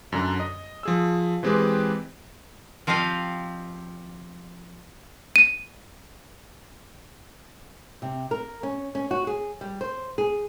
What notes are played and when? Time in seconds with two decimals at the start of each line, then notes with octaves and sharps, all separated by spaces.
0.12 F#2 D3 A#5
0.40 D#5
0.83 F3 G#4 E6
1.43 E3 G#3 C4 G4 G#4 B4
2.87 F3 C4 G4 D#5 F5
5.36 D#7
8.02 C3
8.31 A#4
8.63 C#4
8.95 C#4
9.11 F#4
9.27 G#4
9.61 G3
9.81 C5
10.18 G#4